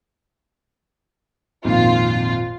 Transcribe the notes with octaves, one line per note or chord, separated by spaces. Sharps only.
G#1 F2 A#2 F4